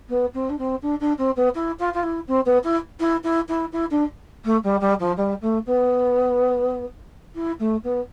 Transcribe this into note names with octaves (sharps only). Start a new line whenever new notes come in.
B3
C4
D4
C4
D4
D4
C4
B3
E4
F4
F4
E4
C4
B3
E4
E4
E4
E4
E4
D4
A3
G3
G3
F3
G3
A3
B3
E4
A3
B3